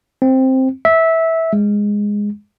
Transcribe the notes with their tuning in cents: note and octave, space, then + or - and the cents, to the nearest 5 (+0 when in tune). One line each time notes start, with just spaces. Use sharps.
C4 +5
E5 -15
G#3 -10